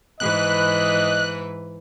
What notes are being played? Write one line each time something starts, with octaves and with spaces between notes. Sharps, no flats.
G#2 E3 B4 D#5 F#6